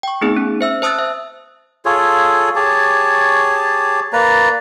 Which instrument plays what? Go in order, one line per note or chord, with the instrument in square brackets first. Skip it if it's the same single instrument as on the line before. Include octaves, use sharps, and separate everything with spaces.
[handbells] G5 C#6
A3 B3 C4 D#4 G#4
C#4
C5 E5 E6
C5 A5 D#6 E6 F#6 A6
E5
[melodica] F4 G#4 A4 C#5
G4 G#4 C#5 A5
A#3 B4 D5 A#5